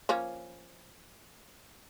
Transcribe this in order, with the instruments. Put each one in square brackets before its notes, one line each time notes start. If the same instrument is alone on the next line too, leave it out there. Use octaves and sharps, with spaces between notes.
[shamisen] F3 A#3 C#4